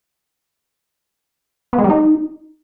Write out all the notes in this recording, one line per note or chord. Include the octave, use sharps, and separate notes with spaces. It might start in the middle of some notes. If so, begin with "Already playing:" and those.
B3
G#3
G3
D#4